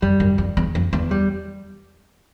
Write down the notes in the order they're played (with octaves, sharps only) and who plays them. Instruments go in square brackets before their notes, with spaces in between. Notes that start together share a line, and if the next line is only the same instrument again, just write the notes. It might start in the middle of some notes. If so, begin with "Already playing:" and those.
[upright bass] F#2 [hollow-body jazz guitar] G3
[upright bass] F#2
F2
E2
F2
E2
[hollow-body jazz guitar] G3